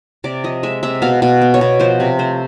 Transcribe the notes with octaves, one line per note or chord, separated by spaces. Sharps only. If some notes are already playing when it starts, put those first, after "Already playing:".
C3 D5
F3 D#5
G#3 E5
C3 E5
B2 F5
B2
B3
C#5
B2
F3 C5
C3
A3 C5